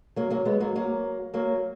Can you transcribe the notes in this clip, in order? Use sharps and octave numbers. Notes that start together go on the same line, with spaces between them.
F#3 A#3
F#3 A#3
G#3 B3
F#3 A#3
F#3 A#3
F#3 A#3